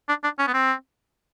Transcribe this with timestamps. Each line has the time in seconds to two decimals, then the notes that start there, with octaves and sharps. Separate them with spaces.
0.09 D4
0.24 D4
0.39 C#4
0.47 B3
0.54 C4